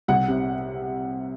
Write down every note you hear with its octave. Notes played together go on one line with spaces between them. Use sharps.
C2 F#5
C3